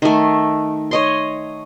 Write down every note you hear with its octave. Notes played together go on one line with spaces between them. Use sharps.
D#3 A3
C#5 D#5 C6